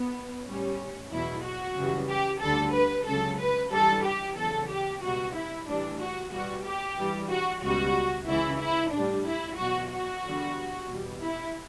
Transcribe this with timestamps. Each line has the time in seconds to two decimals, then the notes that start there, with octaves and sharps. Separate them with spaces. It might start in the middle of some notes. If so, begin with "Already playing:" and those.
Already playing: B3
0.46 A2 G3 C#4
1.11 E2 B2 F#3 E4
1.44 F#4
1.77 F#2 C#3 E3 G3
2.09 G4
2.41 D2 D3 G3 A4
2.74 B4
3.06 C#2 C#3 F#3 A4
3.39 B4
3.72 G2 E3 G3 A4
4.04 G4
4.37 E2 C#3 F#3 A4
4.70 G4
5.02 C#2 B2 G3 F#4
5.35 E4
5.68 A2 E3 G3 D4
6.00 F#4
6.32 E2 B2 G3 F#4
6.64 G4
6.97 G2 E3 G3
7.30 F#4
7.62 C#2 B2 G3 F#4
8.27 C#2 C#3 E3 E4
8.61 E4
8.92 A2 G3 D4
9.25 E4
9.57 E2 B2 F#3 F#4
9.90 F#4
10.23 E2 D3 G3
10.89 E2 B2 G3
11.21 E4